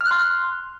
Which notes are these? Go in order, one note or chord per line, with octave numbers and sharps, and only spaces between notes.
F6
F#6
C6